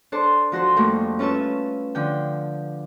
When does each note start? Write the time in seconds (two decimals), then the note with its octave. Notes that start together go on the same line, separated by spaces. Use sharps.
0.12 D4 A4 C5
0.52 F3 F#4 A4 C5
0.76 F2 F3 G3 A3 A#3
1.19 C#4 F4 A4 B4 E5 E6
1.95 D3 F3 G5